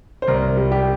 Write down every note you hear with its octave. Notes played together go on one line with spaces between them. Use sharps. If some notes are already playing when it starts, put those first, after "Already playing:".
C5
C2 A#4
G3
G4